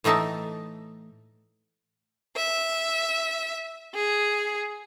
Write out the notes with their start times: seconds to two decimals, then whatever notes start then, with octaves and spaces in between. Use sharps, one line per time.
0.04 A2 E3 A3 D#4 E5 A5
2.36 E5
3.95 G#4